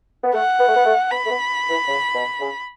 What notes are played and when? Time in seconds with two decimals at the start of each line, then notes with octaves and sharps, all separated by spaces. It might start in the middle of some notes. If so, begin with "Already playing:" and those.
0.24 B3
0.34 A3 F#5
0.59 B3
0.68 A3
0.76 B3
0.85 A3
1.11 B3 B5
1.26 A3
1.30 B3
1.70 E3
1.88 C#3
2.15 B2
2.40 C#3